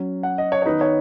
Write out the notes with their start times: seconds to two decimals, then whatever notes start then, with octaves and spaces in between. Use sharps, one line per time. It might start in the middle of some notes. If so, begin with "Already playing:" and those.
Already playing: F#3 C#4
0.23 F#5
0.38 D#5
0.52 C#5
0.62 C#5
0.66 D#3 B3 D#4 B4
0.81 C#5